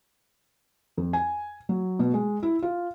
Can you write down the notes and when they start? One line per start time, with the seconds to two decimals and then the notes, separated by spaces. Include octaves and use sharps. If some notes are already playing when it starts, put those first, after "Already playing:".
0.97 F2
1.13 G#5
1.69 F#3
1.99 B2
2.14 G#3
2.43 E4
2.62 F4